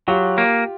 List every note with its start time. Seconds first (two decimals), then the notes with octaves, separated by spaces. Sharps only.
0.08 F#3 F4 G4
0.38 A#3